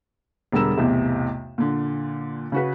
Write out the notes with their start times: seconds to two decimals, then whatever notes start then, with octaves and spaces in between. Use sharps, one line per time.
0.52 E1 D3 G3 A#4 E6 E7
0.77 B1 E2 A2 C3
1.58 A#2 D3
2.52 C#3 F#4 B4